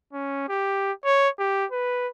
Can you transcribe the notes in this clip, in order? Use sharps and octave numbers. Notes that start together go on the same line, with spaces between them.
C#4
G4
C#5
G4
B4